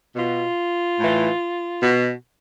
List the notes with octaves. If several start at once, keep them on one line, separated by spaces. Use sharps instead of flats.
B2 F4
A2 E3
B2